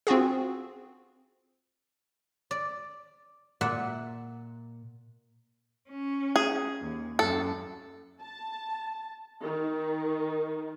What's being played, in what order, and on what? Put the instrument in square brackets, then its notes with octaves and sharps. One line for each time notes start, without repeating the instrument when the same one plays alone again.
[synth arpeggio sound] C4 F4 F#4 G#4
[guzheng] D5
A#2 E5 F#5
[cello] C#4
[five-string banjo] G#4
[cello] D#2
[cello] F#2 [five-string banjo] A4
[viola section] A5
D#3